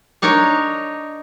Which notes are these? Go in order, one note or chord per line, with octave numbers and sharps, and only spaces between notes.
D4 D#4 A#4 C#5